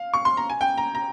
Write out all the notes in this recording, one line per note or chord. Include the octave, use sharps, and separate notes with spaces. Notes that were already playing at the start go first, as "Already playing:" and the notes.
Already playing: F5
C#6
C6
A#5
G#5
G5
A#5
A#5